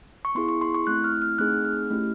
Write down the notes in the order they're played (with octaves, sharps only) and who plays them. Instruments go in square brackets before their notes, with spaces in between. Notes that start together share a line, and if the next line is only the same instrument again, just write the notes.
[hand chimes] C#6
B3 E4 G#4 C6
C#6
C6
C#6
A3 C4 E4 F#6
F6
F6
A3 C4 D#4 G#4 F#6
F6
A3 C#4 E4 G4